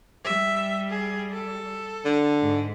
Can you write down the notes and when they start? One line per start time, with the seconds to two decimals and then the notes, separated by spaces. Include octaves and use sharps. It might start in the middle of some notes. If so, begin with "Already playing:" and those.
0.24 G3 E5
0.90 G#4
1.32 A4
2.05 D3
2.41 G#2